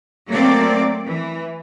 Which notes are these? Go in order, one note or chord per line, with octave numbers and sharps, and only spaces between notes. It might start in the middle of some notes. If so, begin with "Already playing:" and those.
F#3 A3 A#3 C4 D5
E3